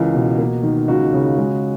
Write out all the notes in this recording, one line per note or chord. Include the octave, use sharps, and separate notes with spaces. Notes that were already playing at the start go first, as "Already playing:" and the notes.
Already playing: C#2 E3 A#4
B2
A#3
D#3
C#2 F#4
C#3
G#3